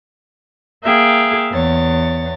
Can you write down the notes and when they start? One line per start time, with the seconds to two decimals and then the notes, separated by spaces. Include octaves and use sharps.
0.84 A#3 G#4 E5 F5 G5
1.51 E2 C#5 A6